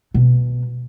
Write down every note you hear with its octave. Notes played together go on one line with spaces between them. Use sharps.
B2